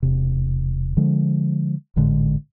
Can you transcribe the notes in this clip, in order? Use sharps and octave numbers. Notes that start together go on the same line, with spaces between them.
E1 C3
D3 F3 G#3
G#1 A2 D3 G#3